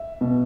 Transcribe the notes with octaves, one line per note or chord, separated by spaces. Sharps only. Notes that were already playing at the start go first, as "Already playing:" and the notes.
Already playing: E5
B2